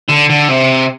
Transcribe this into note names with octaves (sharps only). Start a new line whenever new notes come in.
D3
D3
C3